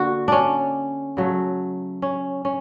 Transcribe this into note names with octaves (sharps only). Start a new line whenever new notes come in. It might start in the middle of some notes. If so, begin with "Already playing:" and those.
Already playing: D3 A#3 F#4
C#4 D4
C#3 F#3 A3
C#4
C#4